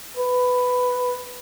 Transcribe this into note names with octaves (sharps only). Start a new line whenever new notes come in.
B4